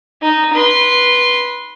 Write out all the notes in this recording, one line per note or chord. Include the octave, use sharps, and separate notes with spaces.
D#4
B4 C6